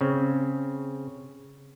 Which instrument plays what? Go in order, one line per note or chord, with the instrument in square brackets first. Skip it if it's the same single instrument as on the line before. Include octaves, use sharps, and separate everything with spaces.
[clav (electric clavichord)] C#3 C4